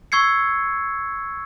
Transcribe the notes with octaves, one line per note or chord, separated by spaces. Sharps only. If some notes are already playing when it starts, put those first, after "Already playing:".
C#6 E6 G#6 C7 C#7